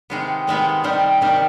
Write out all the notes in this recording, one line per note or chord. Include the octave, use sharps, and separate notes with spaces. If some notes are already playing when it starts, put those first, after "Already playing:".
C3 D#3 G#3 B3
C3 D#3 G#3 B3
C3 D#3 G3
C3 D#3 G3